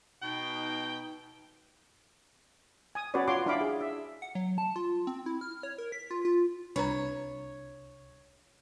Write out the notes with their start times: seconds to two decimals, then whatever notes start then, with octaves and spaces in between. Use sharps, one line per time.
0.22 B2 D#4 G5
2.95 G#5 D#6
3.14 C#4 F#4 B4 C#5 D5
3.28 F4 F#4 C#5 C6 D6
3.46 D4 E4 D5 F5 B5 D6
3.61 G#4
3.81 E5
4.22 F#5
4.35 F#3
4.58 A5
4.76 F4
5.07 C4
5.26 E4
5.41 F6
5.63 C#5
5.78 A#4
5.92 B6
6.11 F4
6.25 F4
6.76 C2 D4 B4 C#5 A#5